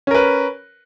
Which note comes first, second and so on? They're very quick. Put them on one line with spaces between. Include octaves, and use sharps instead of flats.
C#4 A#4 B4